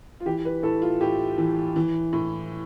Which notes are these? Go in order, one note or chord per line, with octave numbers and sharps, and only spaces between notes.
F4
E3 G4
B4
A2 A4
F4
A2 G4
E3
E3
A2